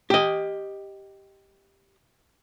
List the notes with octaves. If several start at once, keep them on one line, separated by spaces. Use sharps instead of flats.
G4 D#5